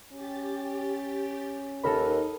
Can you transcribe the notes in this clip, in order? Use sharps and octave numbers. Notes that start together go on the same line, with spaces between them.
C#4 G4 A6
D#2 D#4 A4 A#4 B5